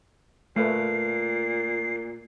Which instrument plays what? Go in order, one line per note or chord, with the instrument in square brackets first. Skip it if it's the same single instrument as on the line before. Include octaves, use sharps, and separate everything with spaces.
[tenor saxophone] A#2 [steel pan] A3 B4 [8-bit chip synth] C7